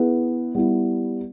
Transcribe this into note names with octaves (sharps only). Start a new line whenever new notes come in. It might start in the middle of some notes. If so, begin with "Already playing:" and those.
Already playing: B3 E4 G#4 B4
G3 B3 E4